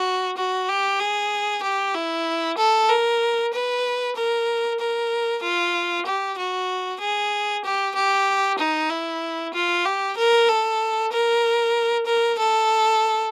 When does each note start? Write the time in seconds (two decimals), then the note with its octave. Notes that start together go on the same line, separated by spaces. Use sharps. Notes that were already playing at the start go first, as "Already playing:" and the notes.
Already playing: F#4
0.37 F#4
0.68 G4
1.00 G#4
1.63 G4
1.95 E4
2.58 A4
2.89 A#4
3.53 B4
4.16 A#4
4.80 A#4
5.43 F4
6.06 G4
6.38 F#4
7.00 G#4
7.65 G4
7.95 G4
8.59 D#4
8.90 E4
9.54 F4
9.85 G4
10.17 A#4
10.49 A4
11.12 A#4
12.06 A#4
12.39 A4